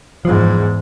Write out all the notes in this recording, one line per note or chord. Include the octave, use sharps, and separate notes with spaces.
E2 G#2 F3